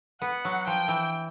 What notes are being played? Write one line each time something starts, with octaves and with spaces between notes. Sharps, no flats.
B3 F#5
F#3
F3 G5
E3